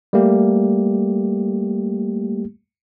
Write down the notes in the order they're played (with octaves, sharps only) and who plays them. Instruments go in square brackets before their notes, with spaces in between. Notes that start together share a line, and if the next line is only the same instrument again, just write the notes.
[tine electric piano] G3 A3 A#3 G4